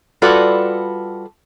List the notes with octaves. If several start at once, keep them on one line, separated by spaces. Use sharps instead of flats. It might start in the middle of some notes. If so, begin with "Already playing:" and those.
G3 F4 F#4 A4 B4 D5